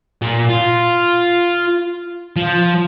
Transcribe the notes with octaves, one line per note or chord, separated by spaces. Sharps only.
A#2
F4
F3